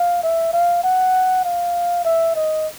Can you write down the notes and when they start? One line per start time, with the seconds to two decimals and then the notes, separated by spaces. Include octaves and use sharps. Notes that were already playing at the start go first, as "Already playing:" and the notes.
Already playing: F5
0.23 E5
0.53 F5
0.84 F#5
1.45 F5
2.05 E5
2.36 D#5